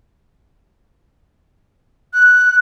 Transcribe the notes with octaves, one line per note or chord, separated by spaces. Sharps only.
F#6